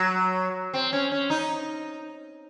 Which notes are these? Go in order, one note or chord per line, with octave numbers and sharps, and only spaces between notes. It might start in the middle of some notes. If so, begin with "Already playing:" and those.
Already playing: F#3
C4
C#4
C#4
D#4